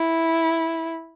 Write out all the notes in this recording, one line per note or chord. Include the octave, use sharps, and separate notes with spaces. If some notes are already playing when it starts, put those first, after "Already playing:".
Already playing: E4